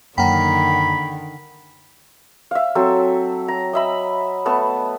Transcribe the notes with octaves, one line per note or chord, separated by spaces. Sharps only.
F#2 D3 D#3 A#3 F#5 G5 A#5 B5
E5 F5
F#3 C4 A4
A#5
D#5 E5 B5
A3 B3 A5